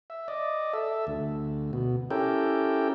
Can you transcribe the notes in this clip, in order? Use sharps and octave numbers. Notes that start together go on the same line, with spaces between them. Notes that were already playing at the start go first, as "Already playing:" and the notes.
E5
D5 D#5
A4 E5
D2
B2
C#4 E4 G4 A4 A#4 G5